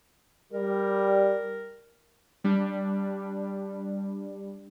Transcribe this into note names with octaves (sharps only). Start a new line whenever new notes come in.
G3 A#4
G3 D4